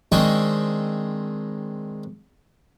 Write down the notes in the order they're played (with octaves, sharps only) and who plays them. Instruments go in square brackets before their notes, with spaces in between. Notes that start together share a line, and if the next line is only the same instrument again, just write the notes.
[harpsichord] D#3 G#3 C4 D4 D#5 C#6